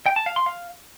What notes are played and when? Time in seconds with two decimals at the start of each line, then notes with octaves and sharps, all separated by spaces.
0.06 G5
0.16 A5
0.26 F5
0.36 C6
0.46 F5